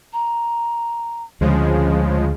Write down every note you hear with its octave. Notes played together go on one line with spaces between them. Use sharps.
A#5
D2 C#3 F3 G#3 G#4